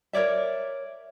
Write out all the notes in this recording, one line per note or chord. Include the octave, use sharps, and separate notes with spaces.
A#4 C#5 D5 E5